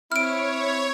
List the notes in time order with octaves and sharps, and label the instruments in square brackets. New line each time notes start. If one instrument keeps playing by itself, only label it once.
[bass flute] C4 [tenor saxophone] E4 [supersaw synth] C#5 [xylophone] F6 D7